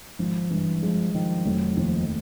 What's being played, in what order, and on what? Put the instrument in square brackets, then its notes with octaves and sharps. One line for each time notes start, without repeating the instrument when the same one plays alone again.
[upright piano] G#1 [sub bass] F3
[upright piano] G2 [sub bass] E3
[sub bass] F3 [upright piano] G#3
[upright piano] D#3 [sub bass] F3
[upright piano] F1 [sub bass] F#3
[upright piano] D#2 [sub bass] F3